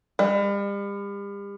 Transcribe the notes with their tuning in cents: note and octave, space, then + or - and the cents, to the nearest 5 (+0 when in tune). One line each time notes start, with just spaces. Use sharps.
G3 +40